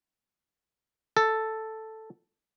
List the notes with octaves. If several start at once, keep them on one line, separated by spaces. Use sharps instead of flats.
A4